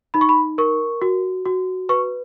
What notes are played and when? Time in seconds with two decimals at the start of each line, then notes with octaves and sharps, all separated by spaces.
0.14 D#4 B5
0.21 C#6
0.29 B5
0.58 A#4 C#6
1.02 F#4
1.46 F#4
1.89 B4 C#6